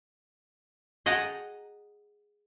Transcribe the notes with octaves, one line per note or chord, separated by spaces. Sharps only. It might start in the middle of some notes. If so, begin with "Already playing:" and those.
G#4 D#5 F#5 G5 A5 A#5